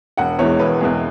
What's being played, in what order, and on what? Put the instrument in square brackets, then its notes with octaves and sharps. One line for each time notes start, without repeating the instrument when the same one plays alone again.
[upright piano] E1 F#5
E2 E3 G#3 C#5
E1 B4
E2 E3 G#3 G#4